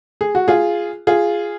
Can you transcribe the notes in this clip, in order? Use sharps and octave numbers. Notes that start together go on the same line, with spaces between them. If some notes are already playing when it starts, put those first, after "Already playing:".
G#4
F#4
F4 G#4
F4 G#4